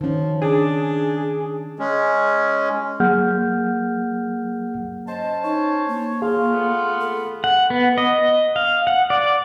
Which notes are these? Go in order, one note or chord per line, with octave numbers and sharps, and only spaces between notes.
D#3 F3 C#4
D4 G#4
G#3 C#4
F#3 A#3 G#4 F#5 F6 G6
C#4 C5 D#5 A5
D#4 C#5
A#3
F4 G#4 F5
A3 B3
A4
F#5
B3
D#5
F5
F#5
D5